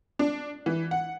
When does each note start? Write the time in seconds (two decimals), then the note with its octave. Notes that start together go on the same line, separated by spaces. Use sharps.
0.19 D4
0.66 E3
0.91 F#5